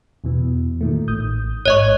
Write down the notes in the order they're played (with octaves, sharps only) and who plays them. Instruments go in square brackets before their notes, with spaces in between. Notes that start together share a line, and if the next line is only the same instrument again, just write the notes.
[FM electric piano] E2 B2 E3
A#2 D#3 A3
A1 D#6 G6
[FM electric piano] A1 G#2 [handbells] C#5 D#5 C#6